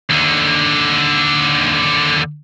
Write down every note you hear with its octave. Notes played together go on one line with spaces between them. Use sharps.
D#2 D3